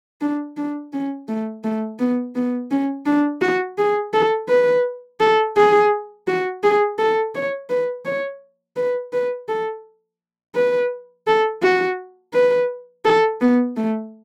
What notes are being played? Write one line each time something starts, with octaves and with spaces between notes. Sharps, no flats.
D4
D4
C#4
A3
A3
B3
B3
C#4
D4
F#4
G#4
A4
B4
A4
G#4
F#4
G#4
A4
C#5
B4
C#5
B4
B4
A4
B4
A4
F#4
B4
A4
B3
A3